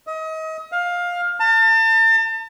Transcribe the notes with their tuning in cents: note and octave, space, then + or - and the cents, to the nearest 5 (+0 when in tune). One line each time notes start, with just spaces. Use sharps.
D#5 +35
F5 +15
A5 +35